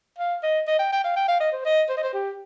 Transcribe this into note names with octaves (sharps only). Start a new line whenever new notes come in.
F5
D#5
D#5
G5
G5
F5
G5
F5
D#5
C5
D#5
C5
D#5
C5
G4